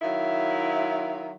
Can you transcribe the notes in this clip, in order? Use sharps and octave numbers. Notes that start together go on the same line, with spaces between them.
D#3 F#3 E4 E5 F5